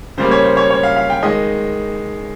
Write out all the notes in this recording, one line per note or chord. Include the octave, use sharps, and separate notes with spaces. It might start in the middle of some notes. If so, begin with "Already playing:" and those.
C#3 G3 A#3 C5
C#5
C5
C#5
C#5
F5
F5
G5
D#3 G#3 D#5